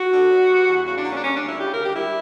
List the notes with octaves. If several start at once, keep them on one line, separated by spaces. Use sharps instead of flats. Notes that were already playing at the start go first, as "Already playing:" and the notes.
Already playing: F#4
D3
B3
G3
E2
C#3 F#4
D4
A#3
C#4
D4
G3 C#4
D4
D2
E4
C#3 G4
A#4
D2
G4
G3 E4